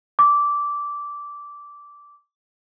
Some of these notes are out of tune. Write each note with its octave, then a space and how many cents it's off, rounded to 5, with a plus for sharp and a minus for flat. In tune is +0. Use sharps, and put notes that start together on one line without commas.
D6 -15